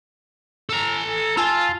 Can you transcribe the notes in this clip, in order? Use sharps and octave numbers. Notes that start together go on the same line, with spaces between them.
A4 A#5
F4 G#5 A5 E6